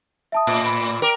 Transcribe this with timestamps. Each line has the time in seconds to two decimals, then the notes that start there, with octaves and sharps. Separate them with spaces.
0.32 E5 A5 D#6
0.47 A2
0.65 B5
1.02 A#4 G5 D6